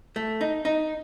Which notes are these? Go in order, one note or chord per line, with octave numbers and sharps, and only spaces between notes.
A3
D#4
D#4